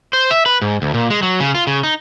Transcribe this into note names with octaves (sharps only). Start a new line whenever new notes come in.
C5
E5
B4
G#2
D2
A#2
G#3
F#3
C#3
F4
C#3
D#4